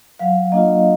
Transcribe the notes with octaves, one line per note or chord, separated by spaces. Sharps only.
F#3 F5
A#3 D4 F4 D#5